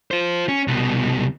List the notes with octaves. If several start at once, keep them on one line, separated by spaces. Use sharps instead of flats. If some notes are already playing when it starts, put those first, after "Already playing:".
F4 C5
C#4
C2 B2